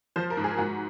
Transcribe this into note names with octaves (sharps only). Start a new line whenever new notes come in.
F3 C5
A#4
G#2
G#4
G#2 F#4